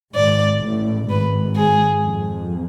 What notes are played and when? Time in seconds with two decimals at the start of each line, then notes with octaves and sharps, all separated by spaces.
0.15 G#1 G#2 D5
0.62 A1 A2
1.09 G#1 G#2 B4
1.56 G#4
2.02 F2